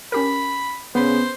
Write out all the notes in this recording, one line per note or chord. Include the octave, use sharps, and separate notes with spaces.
C#4 G4 A#4 B5
C#3 B3 C5 B5